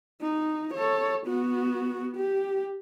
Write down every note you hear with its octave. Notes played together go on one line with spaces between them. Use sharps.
D#4
A4 C#5
B3 F#4
G4